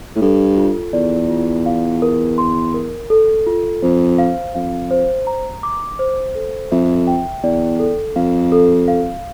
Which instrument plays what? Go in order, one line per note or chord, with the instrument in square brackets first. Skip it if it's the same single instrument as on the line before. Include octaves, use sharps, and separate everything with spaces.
[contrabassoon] A2
[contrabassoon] G2 [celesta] A4
[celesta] F4
[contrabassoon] E2 [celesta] D5
[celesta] F4
F5
A#4
C6
A#4
A4
F4
[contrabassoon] F2 [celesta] C5
[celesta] F5
[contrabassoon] F2 [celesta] F5
[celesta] C5
A#5
D6
C5
A4
[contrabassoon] F2 [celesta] E5
[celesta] G5
[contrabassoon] E2 [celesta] D5
[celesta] A4
[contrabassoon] F2 [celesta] F5
[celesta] A4
F5